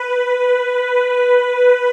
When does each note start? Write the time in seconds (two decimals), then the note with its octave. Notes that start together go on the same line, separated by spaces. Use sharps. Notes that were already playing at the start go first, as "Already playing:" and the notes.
Already playing: B4
0.87 B4